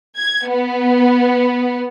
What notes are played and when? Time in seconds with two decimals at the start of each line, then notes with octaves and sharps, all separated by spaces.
0.18 G#6
0.49 B3